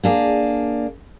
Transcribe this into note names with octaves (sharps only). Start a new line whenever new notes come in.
A#3 D4 G#4